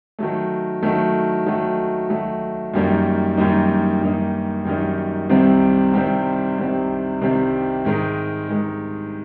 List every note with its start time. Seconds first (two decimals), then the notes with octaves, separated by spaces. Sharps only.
0.19 D#3 F#3 A3
0.83 D#3 F#3 A3
1.46 D#3 F#3 A3
2.10 D#3 F#3 A3
2.74 F#2 D#3 G3 A#3 D#4
3.37 F#2 D#3 G3 A#3 D#4
4.02 F#2 D#3 G3 A#3 D#4
4.65 F#2 D#3 G3 A#3 D#4
5.29 C2 C3 D#3 G3 C4
5.94 C2 C3 D#3 G3 C4
6.57 C2 C3 D#3 G3 C4
7.21 C2 C3 D#3 G3 C4
7.85 G#2 D#3 G#3
8.49 G#2 D#3 G#3